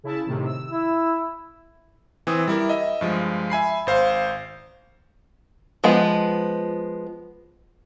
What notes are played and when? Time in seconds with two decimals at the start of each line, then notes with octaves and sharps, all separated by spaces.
0.04 C#3 E4 A5
0.26 A2 C3 D#3
0.46 E6
0.71 E4
2.27 E3 C4 D#6
2.47 G3 E4 A#4
2.69 D#5 E5
3.01 G2 F3 G#3
3.50 E5 G#5 B5 C7
3.87 G#1 C5 F5
5.84 F3 G#3 B3